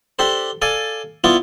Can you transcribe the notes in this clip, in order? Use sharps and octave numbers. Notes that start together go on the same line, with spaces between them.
D4 G4 A4 C5
A4 D5 F5 G#5
B3 E4 F4 D5